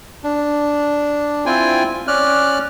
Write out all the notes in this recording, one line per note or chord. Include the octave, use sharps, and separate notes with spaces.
D4
C4 E4 F4 G5 G#5
C#4 D5 F6 F#6